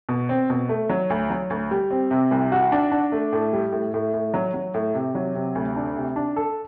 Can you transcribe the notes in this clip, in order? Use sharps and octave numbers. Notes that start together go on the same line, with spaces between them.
B2
C4
B2
A3
F#3
D2
F#3
D2
G3
C4
C3
C2
F#4
D4
D4
A3
A2
G3
A2
A2
A2
F#3
F#3
A2
C3
F#3
C3
D2
D4
C3
D4
A4